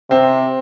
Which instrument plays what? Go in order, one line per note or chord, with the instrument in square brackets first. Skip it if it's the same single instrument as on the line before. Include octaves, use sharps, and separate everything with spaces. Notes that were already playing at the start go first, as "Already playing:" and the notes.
[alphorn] C3 [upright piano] C4